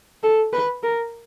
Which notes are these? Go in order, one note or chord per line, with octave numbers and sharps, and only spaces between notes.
A4
B4
A#4